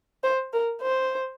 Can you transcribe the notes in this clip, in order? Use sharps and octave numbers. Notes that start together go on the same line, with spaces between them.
C5
A#4
C5